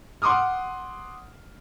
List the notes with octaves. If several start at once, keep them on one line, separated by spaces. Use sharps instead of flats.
F#5 C6 D6 D#6 F6